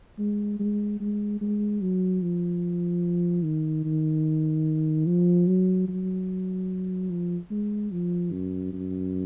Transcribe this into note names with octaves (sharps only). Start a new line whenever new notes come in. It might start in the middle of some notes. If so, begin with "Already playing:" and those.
G#3
G#3
G#3
G#3
F#3
F3
D#3
D#3
F3
F#3
F#3
F3
G#3
F3
F#2
F#2